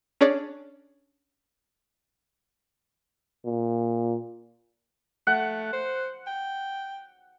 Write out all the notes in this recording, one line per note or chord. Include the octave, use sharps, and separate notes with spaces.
C#4 D4 G#4 C#5 D5
A#2
A3 F#5
C5
G5